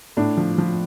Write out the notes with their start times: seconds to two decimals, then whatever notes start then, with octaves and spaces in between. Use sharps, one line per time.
0.17 A2 D4
0.37 F3
0.58 F3